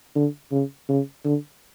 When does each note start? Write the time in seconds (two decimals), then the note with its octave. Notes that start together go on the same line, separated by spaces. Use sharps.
0.15 D3
0.52 C#3
0.89 C#3
1.24 D3